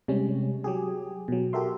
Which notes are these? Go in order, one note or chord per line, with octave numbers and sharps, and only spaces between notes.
C3 G3 G#3 C#4
F#3 G4 G#4
B2 F#3
F#4 G4 A4 A#4 E5 C6